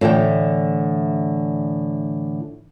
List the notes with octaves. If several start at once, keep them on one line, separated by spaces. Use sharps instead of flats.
A2 D3 E3 G5